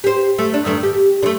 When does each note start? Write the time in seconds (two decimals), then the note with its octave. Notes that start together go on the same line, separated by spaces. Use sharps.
0.04 G4 C5
0.38 A3
0.54 D4
0.65 G2 D#3 A3
0.83 G4
1.23 D3 A3